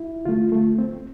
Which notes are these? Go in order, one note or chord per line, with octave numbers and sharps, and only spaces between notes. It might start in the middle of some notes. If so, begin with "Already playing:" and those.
Already playing: E4
D3 A3 F4
A3
C4